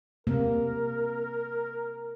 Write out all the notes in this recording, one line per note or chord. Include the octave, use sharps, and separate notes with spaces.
C3 A#3 A#4